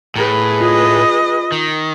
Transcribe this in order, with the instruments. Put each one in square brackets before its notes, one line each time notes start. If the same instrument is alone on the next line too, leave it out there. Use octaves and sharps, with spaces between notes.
[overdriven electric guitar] A2 [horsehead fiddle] G#4 B4
[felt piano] F4 [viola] D#5
[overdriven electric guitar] D#3